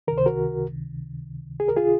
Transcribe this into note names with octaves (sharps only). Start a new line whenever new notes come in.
C#2 C3 D#3 A#4
C5
F#4 A#4
G#4
A#4
F4 G#4